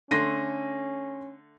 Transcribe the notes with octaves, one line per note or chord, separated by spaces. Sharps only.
D3 A3 C#4 C6 A#6 D#7